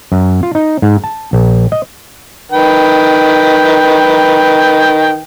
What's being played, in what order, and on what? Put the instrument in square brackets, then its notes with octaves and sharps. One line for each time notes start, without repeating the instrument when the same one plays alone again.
[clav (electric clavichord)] F#2
F4
D#4
G#2
A5
A#1
D#5
[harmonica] D#3 B4 G5